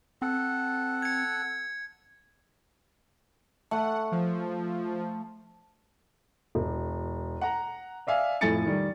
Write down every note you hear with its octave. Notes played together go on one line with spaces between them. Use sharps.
C4 A4 F#5
G#6 C#7
A3 F#5
F3
E1
F#5 A#5
D5 E5 F5 G#5
F2 A2 E4 G#5 A6 C#7
D#3 G3